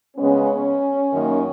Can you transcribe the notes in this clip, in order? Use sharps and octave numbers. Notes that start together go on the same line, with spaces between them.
C#3 G#3 B3 C#4
F#2 D#3 A#3